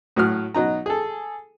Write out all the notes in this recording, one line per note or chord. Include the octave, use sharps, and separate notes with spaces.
A2 F#3 D#6 F6
B2 F#3 D#4 A#5
G#4 A4